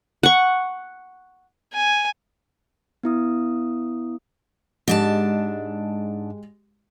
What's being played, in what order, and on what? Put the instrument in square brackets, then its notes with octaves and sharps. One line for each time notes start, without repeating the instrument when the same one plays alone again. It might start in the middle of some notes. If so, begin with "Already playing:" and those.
[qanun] F#5 C#6
[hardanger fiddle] G#5
[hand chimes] B3 E4 D#6
[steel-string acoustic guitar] G#2 D4 A5 [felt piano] G#3 G4